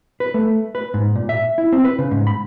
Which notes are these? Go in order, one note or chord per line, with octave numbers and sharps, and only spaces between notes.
B4
A3
B4
G#2
A#2
E5
E4
C4
B4
C#3
G#2
B5